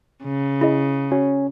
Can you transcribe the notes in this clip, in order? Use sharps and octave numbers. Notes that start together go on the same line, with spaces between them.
C#3
E4 G#4 D#5
C#4 F#4